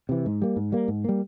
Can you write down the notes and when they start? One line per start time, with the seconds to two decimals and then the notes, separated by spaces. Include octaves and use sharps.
0.09 C3 E3
0.26 G#2
0.42 G3 A#3
0.56 G#2
0.72 G3 A#3
0.88 G#2
1.04 G3 A#3